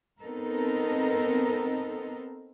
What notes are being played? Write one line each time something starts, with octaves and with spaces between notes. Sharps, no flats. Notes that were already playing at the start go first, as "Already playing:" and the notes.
B3 C4 D#4 A4 A#4